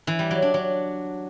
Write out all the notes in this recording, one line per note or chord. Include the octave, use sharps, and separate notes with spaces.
E3
G3
F#3
D4
F#3